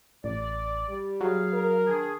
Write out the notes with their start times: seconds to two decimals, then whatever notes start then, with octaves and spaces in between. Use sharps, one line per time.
0.24 A1 D5
0.89 G3
1.21 F#3 G#4 F5
1.53 A#4
1.86 D#3 D4 G#4